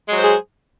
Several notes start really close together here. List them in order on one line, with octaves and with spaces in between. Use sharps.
G#3 F#3 C5 G#4